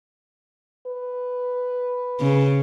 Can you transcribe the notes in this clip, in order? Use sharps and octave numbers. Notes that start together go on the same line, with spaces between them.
B4
C#3